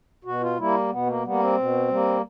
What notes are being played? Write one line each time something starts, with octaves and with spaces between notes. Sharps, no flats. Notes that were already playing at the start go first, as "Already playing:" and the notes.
B2 F#4
F4
G3 A#3 E4
B2 B3
A#3
G3 A#3 B3
C4
B2
G3 A#3